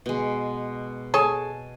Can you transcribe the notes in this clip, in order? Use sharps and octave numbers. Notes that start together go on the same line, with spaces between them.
B2 G#3
G#4 A4 C#5 G#5 A5